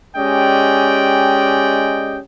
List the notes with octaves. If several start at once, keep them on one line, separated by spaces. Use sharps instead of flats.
G#3 C#4 G4 D5 D#5 G5